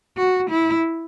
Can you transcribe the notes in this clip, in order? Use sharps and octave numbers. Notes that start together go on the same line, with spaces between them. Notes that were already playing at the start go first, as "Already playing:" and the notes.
F#4
E4